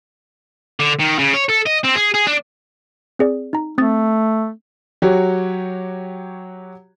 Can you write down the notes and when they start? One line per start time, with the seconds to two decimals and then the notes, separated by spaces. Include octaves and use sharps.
0.80 D3
0.99 D#3
1.19 C#3
1.34 C#5
1.50 A4
1.67 D#5
1.85 C4
1.96 G#4
2.15 G#4
2.27 D4
3.19 C4 G#4 D5
3.53 D#4 A#5
3.78 A3 C4 D#6 A6
5.02 F#3 F#4 G4 C#5